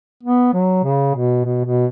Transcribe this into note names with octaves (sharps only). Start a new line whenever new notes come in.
B3
F#3
C#3
B2
B2
B2